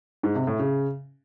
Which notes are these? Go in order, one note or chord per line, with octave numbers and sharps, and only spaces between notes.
G#2
C3
A2
C#3